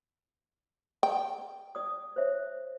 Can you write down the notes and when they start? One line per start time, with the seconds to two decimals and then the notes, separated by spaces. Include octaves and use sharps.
1.03 G5
1.75 D5 D#6
2.16 C5 C#5 E5